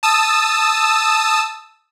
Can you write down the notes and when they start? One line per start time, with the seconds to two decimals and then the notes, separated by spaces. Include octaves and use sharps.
0.03 A5 D#6 E6